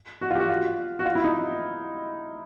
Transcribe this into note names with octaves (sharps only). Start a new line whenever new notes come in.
F#4
F4
G4
F#4
F4
F#4
F4
E4
D#4